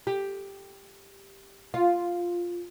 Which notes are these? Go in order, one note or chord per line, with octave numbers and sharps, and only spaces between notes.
G4
F4